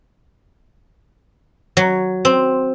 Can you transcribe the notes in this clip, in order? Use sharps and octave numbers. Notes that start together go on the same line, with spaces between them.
F#3
C4